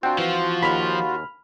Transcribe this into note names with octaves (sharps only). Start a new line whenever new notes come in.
C4 D4 F4 F#4 F#5 G5
E3 F3
D#2 B5 F6